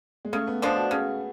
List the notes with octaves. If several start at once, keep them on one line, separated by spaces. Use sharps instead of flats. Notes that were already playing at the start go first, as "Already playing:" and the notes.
G#3
C#3 A3
B3
F3 G#3 B3 D4
F#4
C#3 G#4